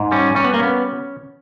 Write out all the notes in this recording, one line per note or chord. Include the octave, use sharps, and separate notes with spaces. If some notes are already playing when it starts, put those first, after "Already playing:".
Already playing: G#2
G3 C#4
G3 C#4
B3
A#3
B3 C#4